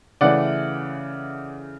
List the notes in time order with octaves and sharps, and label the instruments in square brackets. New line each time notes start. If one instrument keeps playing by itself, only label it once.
[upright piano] C#3 E3 A3 D5 F#5